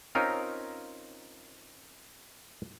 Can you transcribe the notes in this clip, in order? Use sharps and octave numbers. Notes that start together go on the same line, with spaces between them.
C4 C#4 D#4 F4 A#4